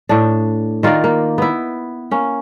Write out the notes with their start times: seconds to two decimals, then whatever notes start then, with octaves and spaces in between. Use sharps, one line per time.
0.09 A2 D4
0.83 D#3 F4 A#4 D5
1.04 A#3
1.38 B3 E4
2.11 A#3 C#4